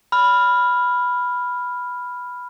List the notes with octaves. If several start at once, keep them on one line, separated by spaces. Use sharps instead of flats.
B5 F6